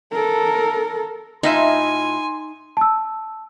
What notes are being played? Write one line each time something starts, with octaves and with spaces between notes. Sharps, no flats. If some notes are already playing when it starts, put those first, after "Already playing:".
A4 A#4
A2 D#4 F4 E5 G#5 C6
A5 E6